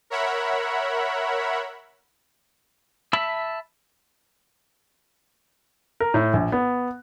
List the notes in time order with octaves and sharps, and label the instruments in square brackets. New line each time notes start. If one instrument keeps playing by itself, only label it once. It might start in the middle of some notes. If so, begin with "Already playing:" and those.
[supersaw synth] A#4 C#5 E5 F#5 B5
[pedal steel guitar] E5 A5 B5 E6
[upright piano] A#4
A2
A#1
B3